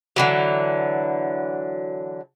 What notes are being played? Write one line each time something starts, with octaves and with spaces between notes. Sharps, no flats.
D3 E3 F#3